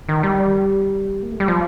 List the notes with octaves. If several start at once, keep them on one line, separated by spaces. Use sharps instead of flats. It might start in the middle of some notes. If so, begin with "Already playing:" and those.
D#3
G3
A#3
A3
G3
F3